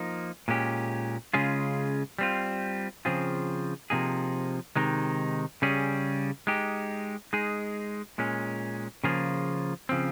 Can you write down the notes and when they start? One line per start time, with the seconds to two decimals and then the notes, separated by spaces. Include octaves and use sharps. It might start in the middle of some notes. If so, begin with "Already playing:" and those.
Already playing: F3 A#3 D#4
0.48 A#2 G#3 C#4 G4
1.33 C#3 G#3 C#4 F4 G#4
2.19 G3 C4 F4
3.05 C#3 F3 C4 F4 G#4
3.90 C3 F3 A#3 D#4 G#4
4.76 C3 D#3 G#3 D#4
5.62 C#3 G3 C#4 G#4
6.47 G#3 D#4 G4
7.33 G#3 D#4 G#4
8.18 A#2 G#3 C#4
9.04 C#3 F3 A#3 F4 G#4
9.89 C#3 F3 C4